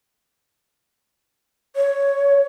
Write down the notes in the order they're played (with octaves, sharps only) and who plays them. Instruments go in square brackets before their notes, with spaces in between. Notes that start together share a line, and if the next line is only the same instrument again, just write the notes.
[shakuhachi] C#5